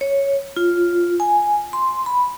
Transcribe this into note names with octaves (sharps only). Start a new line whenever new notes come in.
C#5
F4
G#5
C6
B5